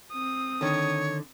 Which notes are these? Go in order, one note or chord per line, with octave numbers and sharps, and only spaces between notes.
C4 D#6
D3 D#3 C#5